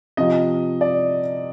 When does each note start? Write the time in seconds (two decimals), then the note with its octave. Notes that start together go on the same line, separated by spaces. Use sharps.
0.17 C3 F3 D#5
0.81 D5